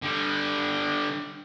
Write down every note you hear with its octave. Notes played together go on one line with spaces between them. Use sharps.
D3 G3